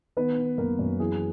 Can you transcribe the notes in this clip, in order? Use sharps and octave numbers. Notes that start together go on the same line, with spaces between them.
D#3 B3 B4
D#3
F#2 A#3 A#4
F#2
E3 G#4